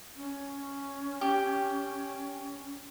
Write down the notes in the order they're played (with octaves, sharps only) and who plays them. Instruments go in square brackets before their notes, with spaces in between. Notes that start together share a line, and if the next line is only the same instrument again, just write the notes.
[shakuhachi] C#4
[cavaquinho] G4